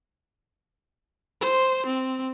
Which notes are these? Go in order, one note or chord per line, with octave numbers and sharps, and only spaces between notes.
C5
C4